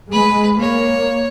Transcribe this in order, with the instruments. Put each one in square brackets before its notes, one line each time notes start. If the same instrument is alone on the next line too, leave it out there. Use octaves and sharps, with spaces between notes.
[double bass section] G#3 [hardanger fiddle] B4
[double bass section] A#3 [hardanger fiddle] C#5